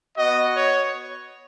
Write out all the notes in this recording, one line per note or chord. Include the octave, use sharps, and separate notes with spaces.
B3 F#4 D#5
C#5